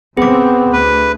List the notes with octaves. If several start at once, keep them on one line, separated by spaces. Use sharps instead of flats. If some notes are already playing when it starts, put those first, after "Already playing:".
C#3 B3 C4 G#4 D6
D2 B4